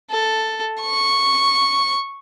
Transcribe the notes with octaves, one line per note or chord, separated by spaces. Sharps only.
A4
C#6